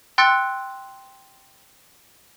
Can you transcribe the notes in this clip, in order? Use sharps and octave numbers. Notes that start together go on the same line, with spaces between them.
G5 C6 E6 F#6 A6 C#7